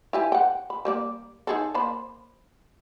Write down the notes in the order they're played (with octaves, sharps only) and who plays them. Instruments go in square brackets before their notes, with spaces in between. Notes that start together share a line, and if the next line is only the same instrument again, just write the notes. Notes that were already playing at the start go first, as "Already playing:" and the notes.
[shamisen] E4 G4 G#5
F#5 G5
B5
G3 A#3 D5
D#4 G#4 A4
A#3 C5 B5